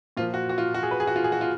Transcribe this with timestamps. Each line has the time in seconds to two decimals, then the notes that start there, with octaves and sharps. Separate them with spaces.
0.17 A#2 F3 F4
0.34 F#4
0.49 F#4
0.58 F4
0.74 F#4
0.83 G#4
0.91 B4
1.00 G#4
1.07 F#4
1.16 F4
1.24 G#4
1.32 F#4
1.41 F4